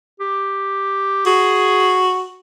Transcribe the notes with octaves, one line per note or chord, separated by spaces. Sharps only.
G4
F#4 G#4